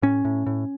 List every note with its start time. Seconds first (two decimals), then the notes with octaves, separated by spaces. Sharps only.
0.02 A2 C#4
0.25 A2
0.46 A2